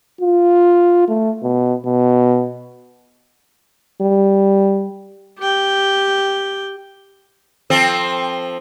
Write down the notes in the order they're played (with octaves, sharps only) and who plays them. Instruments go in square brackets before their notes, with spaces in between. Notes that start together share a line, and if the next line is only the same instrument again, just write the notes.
[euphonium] F4
A3
B2
B2
[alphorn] G3
[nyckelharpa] G4 G5
[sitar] F3 C4 A4